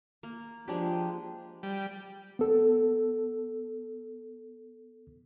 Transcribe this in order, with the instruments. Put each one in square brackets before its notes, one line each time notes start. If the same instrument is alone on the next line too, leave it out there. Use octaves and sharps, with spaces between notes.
[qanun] A#3
[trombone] F3 [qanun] G#3 D4 G4
[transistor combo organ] G3
[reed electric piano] B3 A4